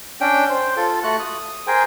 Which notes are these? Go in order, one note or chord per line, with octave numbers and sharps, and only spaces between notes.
C#4 D4 G5
C5
F4 A4
A3 F#4 F#5 F#6
D#6
G#4 A#4 C5 G5 G#5